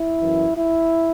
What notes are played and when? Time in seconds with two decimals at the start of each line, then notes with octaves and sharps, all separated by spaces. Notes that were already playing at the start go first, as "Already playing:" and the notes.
Already playing: E4
0.21 F#2 E3
0.56 E4